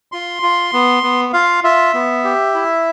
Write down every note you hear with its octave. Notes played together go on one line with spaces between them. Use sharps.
F4 C6
F4
B3
B3
F4 F5
F4 E5
B3
G4
E4